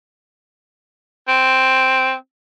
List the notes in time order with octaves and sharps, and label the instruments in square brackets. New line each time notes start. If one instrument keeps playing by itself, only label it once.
[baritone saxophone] C4